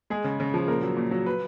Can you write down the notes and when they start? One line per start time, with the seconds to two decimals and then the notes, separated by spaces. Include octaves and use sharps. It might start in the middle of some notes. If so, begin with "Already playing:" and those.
0.10 G#3 G#4
0.24 C#3
0.40 C#3
0.54 F3
0.68 A#2 A#4
0.83 F#3
0.97 A#2
1.11 F#3
1.26 B4